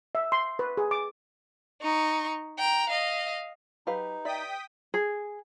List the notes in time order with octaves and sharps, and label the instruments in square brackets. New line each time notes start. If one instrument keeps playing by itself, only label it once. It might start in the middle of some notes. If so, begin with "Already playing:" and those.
[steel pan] E5
C6
B4
G#4
D6
[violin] D#4 C#6
G5 A#5
D#5 F5
[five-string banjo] F#3 F5 [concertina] D#4 [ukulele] G4 B4
[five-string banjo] D5 E5 [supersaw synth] G5 D#6 B6
[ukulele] G#4